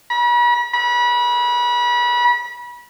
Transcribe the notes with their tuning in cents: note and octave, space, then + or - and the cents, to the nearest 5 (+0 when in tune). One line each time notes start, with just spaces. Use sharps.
B5 -40
B5 -30